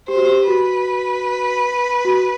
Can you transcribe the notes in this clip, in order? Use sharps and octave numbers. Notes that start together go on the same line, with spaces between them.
G4 C5
F#4
G4
F#4 B4
F#4